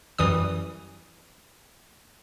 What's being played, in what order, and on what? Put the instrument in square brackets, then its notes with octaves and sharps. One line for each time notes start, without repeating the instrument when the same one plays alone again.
[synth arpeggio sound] F#2 E3 G3 D#6